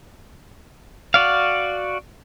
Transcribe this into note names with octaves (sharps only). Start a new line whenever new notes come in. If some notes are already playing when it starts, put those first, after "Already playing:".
F#4 D5 F5